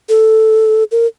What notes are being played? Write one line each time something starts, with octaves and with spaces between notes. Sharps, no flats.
A4
A#4